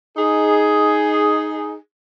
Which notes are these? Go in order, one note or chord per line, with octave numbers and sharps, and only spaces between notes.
D#4 G#4